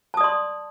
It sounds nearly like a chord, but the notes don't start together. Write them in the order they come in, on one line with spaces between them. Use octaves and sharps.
A5 D#6 D5 C6